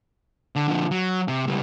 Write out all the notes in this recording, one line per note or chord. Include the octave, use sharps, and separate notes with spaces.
D3
D3 F3
F#3
C3
C#2 G3